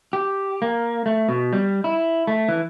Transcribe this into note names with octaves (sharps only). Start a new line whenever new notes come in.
G4
A#3
A3
B2
G3
E4
A3
E3